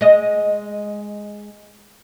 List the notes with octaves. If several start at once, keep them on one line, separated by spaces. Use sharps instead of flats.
G#3 D#5